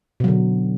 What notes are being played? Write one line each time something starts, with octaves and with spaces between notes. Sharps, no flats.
B2 D3 F#3